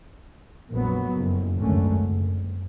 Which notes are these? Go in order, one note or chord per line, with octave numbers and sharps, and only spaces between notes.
A#1 F2 F#3 B3
F#1 F2
G#1 C#2 F#2 D3 A3 C#4
F#1